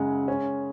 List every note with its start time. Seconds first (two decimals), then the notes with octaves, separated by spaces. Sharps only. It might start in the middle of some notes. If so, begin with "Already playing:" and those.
Already playing: F#2 C#3 G#3 F#5
0.28 C#4